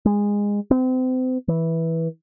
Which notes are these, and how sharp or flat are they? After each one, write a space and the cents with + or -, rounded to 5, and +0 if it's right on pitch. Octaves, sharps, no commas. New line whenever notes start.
G#3 -20
C4 -35
E3 -10